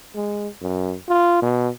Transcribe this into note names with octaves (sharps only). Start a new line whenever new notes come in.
G#3
F#2
F4
B2